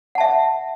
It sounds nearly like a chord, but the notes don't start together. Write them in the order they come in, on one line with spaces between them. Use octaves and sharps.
F#5 A5 E5